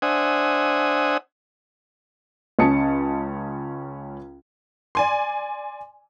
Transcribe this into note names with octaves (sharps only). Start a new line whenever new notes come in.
D4 C5 E5 F#5 G#5 D#6
C#2 C#4 A5 D#6 C#7
D5 G#5 C6